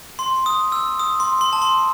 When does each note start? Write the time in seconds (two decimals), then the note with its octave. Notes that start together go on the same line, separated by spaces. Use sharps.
0.19 C6
0.46 D#6
0.72 E6
0.99 D#6
1.20 C6
1.41 C6
1.53 A5
1.62 C6